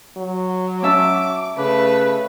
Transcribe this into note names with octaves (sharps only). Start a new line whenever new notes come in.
F#3
C#4 E5 A5 D6
C#3 A3 B4